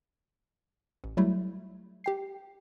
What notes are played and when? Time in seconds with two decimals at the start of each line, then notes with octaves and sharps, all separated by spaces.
1.04 A1
1.17 F#3 G3 A3 E4
2.04 G4 G5 C7